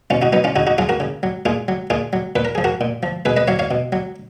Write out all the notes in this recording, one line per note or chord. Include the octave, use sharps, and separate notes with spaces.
B2 C#4 F4
D#4 F#4
F#3 B3 D#4
C#4 F4
C#3 D#4 F#4
D#4 F#4
F#3 F4 G#4
F#4 A#4
C#3
F#3
A#2 F4 G#4
F#3
A#2 F4 G#4
F#3
A#2 B4
A#4
F3 G#4
F#4 A#4
A#2
F3
B2 G#4 B4
B4 D#5
F#3 C#5 F5
C#5 F5
B2
F#3